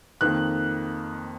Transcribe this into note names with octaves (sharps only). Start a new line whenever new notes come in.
F2 D#3 A#3 F#6